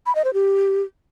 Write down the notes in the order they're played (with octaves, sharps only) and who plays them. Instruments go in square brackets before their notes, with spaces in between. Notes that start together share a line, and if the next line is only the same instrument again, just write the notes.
[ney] B5
D#5
C5
G4